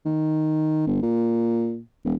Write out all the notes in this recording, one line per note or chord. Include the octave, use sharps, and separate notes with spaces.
D#3
G1
A#2
E1